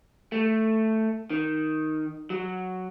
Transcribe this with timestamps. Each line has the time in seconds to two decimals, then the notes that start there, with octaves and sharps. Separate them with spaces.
0.32 A3
1.30 D#3
2.30 F#3